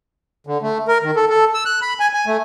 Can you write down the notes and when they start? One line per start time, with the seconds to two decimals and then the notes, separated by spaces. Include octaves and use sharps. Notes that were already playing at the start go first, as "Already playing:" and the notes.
0.47 D3
0.62 A3
0.88 A#4
1.03 D#3
1.16 A4
1.29 A4
1.54 E6
1.65 F#6
1.82 B5
2.00 G#5
2.14 G#5
2.27 A3